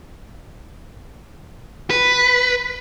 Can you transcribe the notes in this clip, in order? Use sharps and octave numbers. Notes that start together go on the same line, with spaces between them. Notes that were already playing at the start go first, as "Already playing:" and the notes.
B4